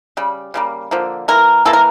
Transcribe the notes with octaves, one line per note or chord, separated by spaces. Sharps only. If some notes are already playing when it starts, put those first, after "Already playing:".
C#3 G3
C#3 G3 A#3
D3 F3 A#3
E3 A#3 A#4
E3 A#3 A4
A#4